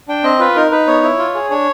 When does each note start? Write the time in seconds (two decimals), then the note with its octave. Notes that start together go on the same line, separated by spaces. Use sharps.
0.08 D4 G5
0.24 C4 D#5
0.39 F4 B4
0.56 D#4 A#4
0.71 D#4 B4
0.87 B3 C#5
1.03 E4
1.19 F4
1.35 G#4
1.50 D4 C#5